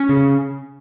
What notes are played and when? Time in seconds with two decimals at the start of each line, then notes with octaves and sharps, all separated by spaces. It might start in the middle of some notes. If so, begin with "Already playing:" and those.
Already playing: C#4
0.09 C#3